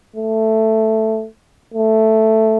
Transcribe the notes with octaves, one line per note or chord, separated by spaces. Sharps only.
A3
A3